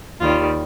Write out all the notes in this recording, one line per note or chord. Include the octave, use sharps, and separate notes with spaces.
D#2 D#3 G3 F4